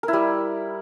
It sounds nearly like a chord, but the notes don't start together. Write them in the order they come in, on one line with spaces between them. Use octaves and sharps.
A#4 E4 G3